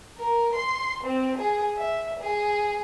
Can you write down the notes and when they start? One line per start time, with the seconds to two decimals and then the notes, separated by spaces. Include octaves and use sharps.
0.18 A#4
0.55 C6
1.04 C4
1.38 G#4
1.78 E5
2.20 G#4